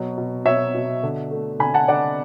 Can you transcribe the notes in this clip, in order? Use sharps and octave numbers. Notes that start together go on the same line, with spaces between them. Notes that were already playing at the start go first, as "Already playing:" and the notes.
Already playing: B2 F#3
B2
B2 C#5 E5
B2
D3
A3
D3 G#5 B5
F#5 A5
D3 D5 F#5